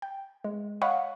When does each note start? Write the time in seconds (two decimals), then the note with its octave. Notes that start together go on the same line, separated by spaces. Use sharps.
0.02 G5
0.44 G#3
0.82 C#5 D#5 F5 F#5 B5 C#6